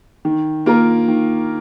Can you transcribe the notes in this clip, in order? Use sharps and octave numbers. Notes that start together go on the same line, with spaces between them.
D#3
A#3 F4 A#4
D#3